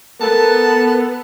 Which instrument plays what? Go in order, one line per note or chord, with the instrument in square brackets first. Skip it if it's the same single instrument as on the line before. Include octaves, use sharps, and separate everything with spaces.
[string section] B3 [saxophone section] A4 [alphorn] A#4 [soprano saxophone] A5